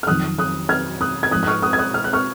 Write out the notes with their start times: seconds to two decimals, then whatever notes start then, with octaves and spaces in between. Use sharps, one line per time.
0.03 F6
0.07 F2 D#3 F#3 D#6 F#6
0.39 D#6 F#6
0.69 F6 G#6
1.01 D#6 F#6
1.23 G#6
1.31 G#2 F3 D#6 F#6
1.43 F#6
1.47 C#6 F6
1.62 D#6 F#6
1.73 G#6
1.79 D#6 F#6
1.94 F6
2.04 F#6
2.13 C#6 F6